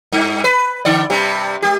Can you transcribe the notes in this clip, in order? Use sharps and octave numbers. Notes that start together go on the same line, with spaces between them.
G2
B4
D3 D5
G2 C3 G3
G#3 G4